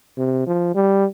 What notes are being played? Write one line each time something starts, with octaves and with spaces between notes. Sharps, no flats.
C3
F3
G3